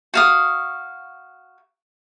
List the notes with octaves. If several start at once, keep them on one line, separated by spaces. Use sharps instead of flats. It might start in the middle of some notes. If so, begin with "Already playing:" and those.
F#4 F5 D#6